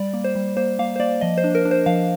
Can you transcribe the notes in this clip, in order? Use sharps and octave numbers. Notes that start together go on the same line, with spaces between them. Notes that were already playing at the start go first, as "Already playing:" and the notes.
Already playing: G3 D5
A#3
C5
G3
A#3 C5
A#3 F5
C5
A#3 D5
F3 D#5
C5
D4
A#4
D4
C5
F3 F5